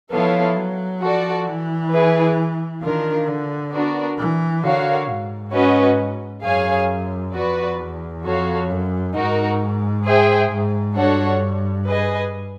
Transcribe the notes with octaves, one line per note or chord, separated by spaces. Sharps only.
F3 B3 E4 A4 C#5 F5
F#3
F3 F#4 A4 D5
E3
E4 G#4 B4
D#3 D4 F4 A#4
D3
B3 D4 F#4 A#4 D5
E3
D3 F#4 A#4 C#5 F5
G#2
C#4 F#4 B4 D#5
F#2 G#4 C#5 F5 G#5
F2 F#4 B4 D5
E2
F2 F#4 A4 C#5 F5
F#2
G#2 D#4 F#4 A#4
G#4 C5 E5 G5
G#2
G2 D4 F#4 A4 C#5 F#5
G#4 B4 D#5 G#5